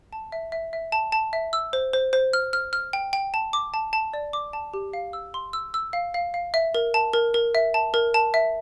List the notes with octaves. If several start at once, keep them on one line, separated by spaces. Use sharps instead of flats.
A5
E5
E5
E5
A5
A5
E5
E6
C5
C5
C5
F6
F6
F6
G5
G5
A5
D6
A5
A5
D5
D6
A5
G4
F5
E6
C6
E6
E6
F5
F5
F5
E5
A#4
A5
A#4
A#4
E5
A5
A#4
A5
E5